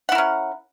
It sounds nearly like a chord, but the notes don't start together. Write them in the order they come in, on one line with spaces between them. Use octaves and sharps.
F#5 E4 A#4 C#4